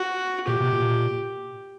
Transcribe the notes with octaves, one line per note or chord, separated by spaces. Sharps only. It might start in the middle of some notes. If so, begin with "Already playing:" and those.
Already playing: F#4
A#2 G4
B2
A#2